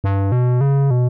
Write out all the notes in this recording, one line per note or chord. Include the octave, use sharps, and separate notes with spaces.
G2
B2
C#3
B2